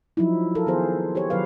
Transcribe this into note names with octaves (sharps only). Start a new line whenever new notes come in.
F3 F#3 D#4 E4
F4 A4 A#4
D#3 B3 G#4 C5
G4 C5 C#5
D#3 F#3 B4 F5